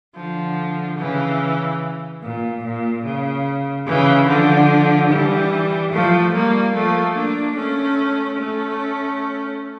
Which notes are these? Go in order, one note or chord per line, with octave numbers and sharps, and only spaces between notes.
D3 F3
C#3 E3
A#2
A#2
C#3
C#3 E3
D3 F3
E3 G3
F3 A3
G3 A#3
F3 A3
A#3 D4
A3 C#4
A3 C#4